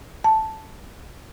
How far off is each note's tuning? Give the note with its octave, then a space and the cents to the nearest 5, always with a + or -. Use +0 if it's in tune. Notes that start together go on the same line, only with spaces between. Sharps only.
A5 +0